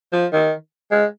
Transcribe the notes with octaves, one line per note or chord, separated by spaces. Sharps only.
F3
D#3
G#3